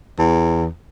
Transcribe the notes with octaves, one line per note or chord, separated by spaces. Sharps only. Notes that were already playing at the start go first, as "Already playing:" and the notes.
E2